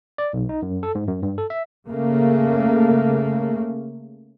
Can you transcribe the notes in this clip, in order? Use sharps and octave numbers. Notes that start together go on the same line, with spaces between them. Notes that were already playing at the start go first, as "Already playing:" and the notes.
D5
B1
D#4
F#2
A4
G#2
F#2
G2
A4
E5
C#3 A3 A#3